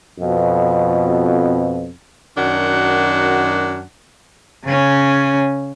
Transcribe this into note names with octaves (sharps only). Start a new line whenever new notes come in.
F2 B2
F#2 D#3 D4 F#4 F#5
C#3 C#4